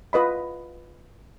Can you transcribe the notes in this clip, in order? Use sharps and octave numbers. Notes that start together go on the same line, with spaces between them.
F4 B4 D#5 B5